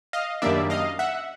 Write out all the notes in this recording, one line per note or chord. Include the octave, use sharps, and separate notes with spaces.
D#5 F5
F#2 D#3 G3 A#3 D4 D5 E5
D#5 F5
E5 F#5